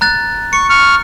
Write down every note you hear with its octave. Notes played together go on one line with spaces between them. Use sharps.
A#5 F#6 A6
C#6 C#7
C#6 F6